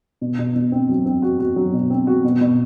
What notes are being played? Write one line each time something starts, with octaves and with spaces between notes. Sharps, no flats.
B2
B2
B2
C4
F#3
C4
F#4
F#4
F#3
B2
C4
F#4
B2
B2